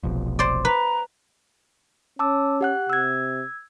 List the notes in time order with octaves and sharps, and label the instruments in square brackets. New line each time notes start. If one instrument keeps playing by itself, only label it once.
[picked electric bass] F1 B1 F2
[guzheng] C5 D5
[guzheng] B4 [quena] A#5
[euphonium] C#4 [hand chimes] A5 D6 E6
[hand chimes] G4 F#5 F#6
[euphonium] C3 [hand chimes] E6 G#6